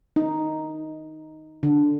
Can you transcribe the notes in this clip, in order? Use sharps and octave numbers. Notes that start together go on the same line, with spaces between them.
D#4
D3